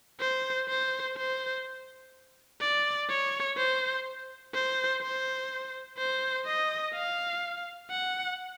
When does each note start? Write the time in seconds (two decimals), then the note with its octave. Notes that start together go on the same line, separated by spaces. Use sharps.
0.20 C5
0.69 C5
1.17 C5
2.61 D5
3.09 C#5
3.57 C5
4.54 C5
5.02 C5
5.98 C5
6.46 D#5
6.94 F5
7.90 F#5